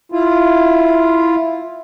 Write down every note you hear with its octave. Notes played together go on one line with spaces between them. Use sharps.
E4 F4